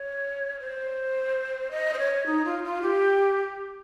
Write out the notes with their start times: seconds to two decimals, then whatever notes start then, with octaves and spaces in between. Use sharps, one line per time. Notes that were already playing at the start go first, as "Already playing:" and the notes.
Already playing: C#5
0.60 C5
1.71 D#5
1.94 C5
1.99 C#5
2.26 D#4
2.45 F4
2.64 F4
2.82 G4